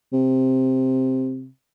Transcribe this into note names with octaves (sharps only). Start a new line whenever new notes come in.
C3